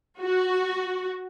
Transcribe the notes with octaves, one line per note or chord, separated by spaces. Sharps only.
F#4